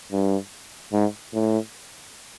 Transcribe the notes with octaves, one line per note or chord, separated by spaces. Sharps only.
G2
G#2
A2